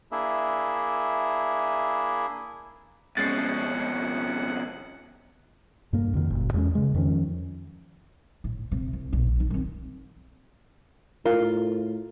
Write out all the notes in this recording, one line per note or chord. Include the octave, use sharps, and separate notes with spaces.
A#3 D4 E4 G#4 E5
F2 B2 G#3 C#4 F#5 A6 C7
G2 A#3
F2 D3 D#3
F#1 A#2
E2 G#3 C#4
C#3 G#3
F2 D#3 F3 C#4
A2
C3
C2
A#1 B2
D#3 D#4
D#3 C4
A2 F4 A#4